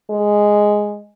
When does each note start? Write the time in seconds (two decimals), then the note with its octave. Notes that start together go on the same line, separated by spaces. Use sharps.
0.10 G#3